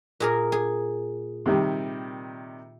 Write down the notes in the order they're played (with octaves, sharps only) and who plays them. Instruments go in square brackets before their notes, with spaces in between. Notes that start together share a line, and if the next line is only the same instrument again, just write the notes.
[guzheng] A#2 G#4 A#4
G#4
[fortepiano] C3 D#3 G3